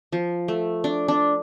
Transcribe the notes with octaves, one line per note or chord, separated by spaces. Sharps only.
F3
A3
D4
D4